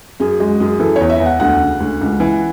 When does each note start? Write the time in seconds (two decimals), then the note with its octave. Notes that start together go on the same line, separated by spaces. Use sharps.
0.20 F#2 G#4
0.39 G#3 F#4
0.60 F#2 G#4
0.80 E3 A4
0.96 E2 C#5
1.10 E5
1.20 E2
1.26 F#5
1.40 D2 F#5
1.61 C#3
1.80 D2
2.01 C#2
2.20 E3